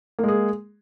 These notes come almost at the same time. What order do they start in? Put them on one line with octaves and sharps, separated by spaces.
A#3 G#3 G#4